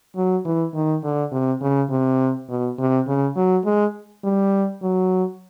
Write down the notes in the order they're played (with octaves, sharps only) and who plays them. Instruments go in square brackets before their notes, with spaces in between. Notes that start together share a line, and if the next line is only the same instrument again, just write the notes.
[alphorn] F#3
E3
D#3
D3
C3
C#3
C3
B2
C3
C#3
F#3
G#3
G3
F#3